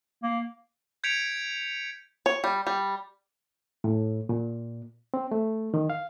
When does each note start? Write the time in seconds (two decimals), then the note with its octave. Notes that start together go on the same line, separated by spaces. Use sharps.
0.23 A#3
1.04 G6 G#6 B6 C#7 D7 F7
2.26 C#5
2.44 G3
2.67 G3
3.84 A2
4.29 A#2
5.14 C4
5.32 A3
5.74 D#3
5.90 F5